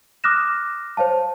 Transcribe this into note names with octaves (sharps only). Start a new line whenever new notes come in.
D6 D#6 F6 F#6 A#6 E7
C5 C#5 F5 A5